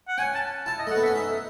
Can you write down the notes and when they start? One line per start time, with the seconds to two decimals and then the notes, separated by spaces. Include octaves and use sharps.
0.08 F#5
0.18 C#4 G#5
0.34 A5
0.66 E4 A5
0.79 D#5
0.87 A3 F#5
0.95 B3
1.03 E5
1.06 C#4
1.15 D#4 E5